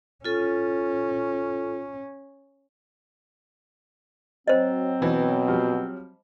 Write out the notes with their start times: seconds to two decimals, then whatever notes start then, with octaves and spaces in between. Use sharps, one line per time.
0.24 C#4 F4 A4
4.48 F#3 C4 C5 D#5
5.02 B2 E3
5.48 F3 G3